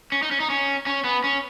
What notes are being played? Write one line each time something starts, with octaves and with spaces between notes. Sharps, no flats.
C#4
D#4
C#4
D#4
C#4
C#4
B3
C#4